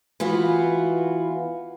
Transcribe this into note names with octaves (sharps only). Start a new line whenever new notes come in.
E3 B3 F4 F#4